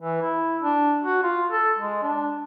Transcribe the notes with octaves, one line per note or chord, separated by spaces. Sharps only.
E3
E4
D4
F#4
F4
A4
G#3
D4